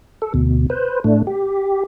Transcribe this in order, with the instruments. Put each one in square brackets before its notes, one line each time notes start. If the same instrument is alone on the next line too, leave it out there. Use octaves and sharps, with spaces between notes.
[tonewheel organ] A4
D2 B2
B4 C5
A2 A3 D4
G4